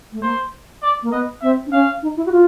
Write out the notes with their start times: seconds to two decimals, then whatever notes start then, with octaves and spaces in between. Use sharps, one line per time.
0.12 A3
0.22 A#3 C5
0.83 D5
1.03 A#3
1.12 B3 D#5
1.42 C4 E5
1.66 D4
1.72 C#4 F5
2.03 D#4
2.17 E4
2.26 F#4
2.32 F4